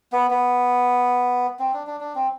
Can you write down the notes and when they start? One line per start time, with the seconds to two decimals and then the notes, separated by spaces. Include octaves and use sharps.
0.12 B3
0.31 B3
1.59 C4
1.73 D4
1.87 D4
2.00 D4
2.15 C4